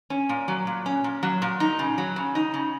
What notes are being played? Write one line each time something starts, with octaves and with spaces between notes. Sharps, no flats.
C#4
A#2
F#3
A#2
C#4
A#2
F#3
A#2
D#4
C#3
F#3
C#3
D#4
C#3